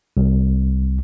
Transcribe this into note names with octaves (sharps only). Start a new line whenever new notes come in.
C2